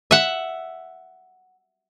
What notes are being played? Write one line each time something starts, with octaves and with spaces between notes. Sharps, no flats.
E5 F#5